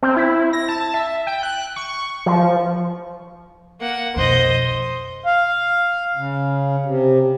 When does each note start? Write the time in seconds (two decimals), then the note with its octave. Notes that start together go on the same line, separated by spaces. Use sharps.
0.03 C4
0.16 E4
0.53 A#6
0.69 A5
0.94 E5
1.27 G5
1.43 F#6
1.76 C#6
2.26 F3
3.80 A#3 F#5
4.16 B1 F2 C5 D#5
5.24 F5
6.17 C#3
6.85 C3